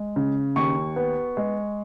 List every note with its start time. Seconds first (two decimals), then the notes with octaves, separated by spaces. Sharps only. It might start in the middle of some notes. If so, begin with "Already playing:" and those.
Already playing: G#3
0.16 C#3
0.56 D#2 C#6
0.96 B3
1.37 G#3